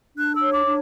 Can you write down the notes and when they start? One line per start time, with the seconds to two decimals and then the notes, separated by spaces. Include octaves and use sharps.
0.16 D4 F#6
0.35 E6
0.41 C#5
0.53 D6
0.65 D4